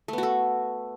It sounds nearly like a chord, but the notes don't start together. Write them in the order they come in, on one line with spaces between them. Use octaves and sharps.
A3 B3 F#4 A4